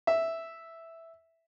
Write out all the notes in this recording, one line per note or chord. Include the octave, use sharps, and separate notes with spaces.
E5